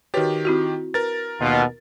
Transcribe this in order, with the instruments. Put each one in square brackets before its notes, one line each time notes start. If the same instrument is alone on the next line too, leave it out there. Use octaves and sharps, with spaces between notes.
[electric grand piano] D#3 G4 [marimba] F#4 B4 C#5
[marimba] C4 E4 F#4
[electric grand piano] A#4 A6 [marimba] B4
[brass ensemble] D#2 B2 F4